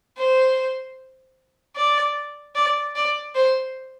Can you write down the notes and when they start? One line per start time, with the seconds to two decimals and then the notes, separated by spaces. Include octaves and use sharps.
0.17 C5
1.76 D5
2.55 D5
2.95 D5
3.35 C5